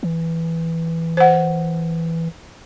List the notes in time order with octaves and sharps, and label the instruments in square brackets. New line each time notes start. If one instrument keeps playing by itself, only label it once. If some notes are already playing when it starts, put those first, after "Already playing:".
[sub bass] E3
[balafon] C5 F#5